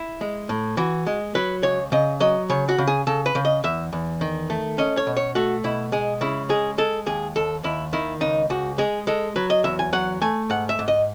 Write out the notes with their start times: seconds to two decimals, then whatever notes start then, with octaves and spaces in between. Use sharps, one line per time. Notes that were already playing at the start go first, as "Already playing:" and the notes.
Already playing: E4
0.21 G#3
0.49 A2
0.77 E3 F#4
1.07 G#3
1.35 F#3 B4
1.63 C#2 C#5
1.92 C#3 D#5
2.20 F#3 D#5
2.50 C#3 C#5
2.69 F#4
2.78 C#3
2.87 G#4
3.07 C#3 A4
3.26 B4
3.35 C#3
3.45 D#5
3.64 E2 E5
3.93 E2
4.21 D#3
4.50 A3
4.78 C#4 D#5
4.97 C#5
5.07 B2
5.17 C#5
5.35 A3 F#4
5.64 B2 E4
5.92 G#3 G#4
6.21 C#3 E4
6.49 G#3 G#4
6.78 G#3 A4
7.06 D#2 G#4
7.36 D#2 A4
7.64 D#2 E4
7.93 D#3 E4
8.21 C#2 D#4
8.50 C#2 F#4
8.78 G#3 G#4
9.07 G#3 A4
9.36 F#3 B4
9.50 D#5
9.64 E2 E5
9.79 G#5
9.93 F#3 F#5
10.21 A3 G#5
10.50 G#2 F#5
10.69 E5
10.79 G#2
10.88 D#5